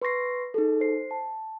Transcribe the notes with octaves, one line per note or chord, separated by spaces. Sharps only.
B4 C6 C#6 A#6 C7
D#4 G#4 A4
C5 C7
A5